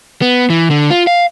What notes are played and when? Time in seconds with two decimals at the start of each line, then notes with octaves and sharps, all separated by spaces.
0.22 B3
0.50 E3
0.71 D3
0.90 F4
1.07 F5